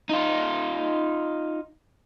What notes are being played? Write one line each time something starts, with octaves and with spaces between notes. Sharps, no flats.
D#4 F4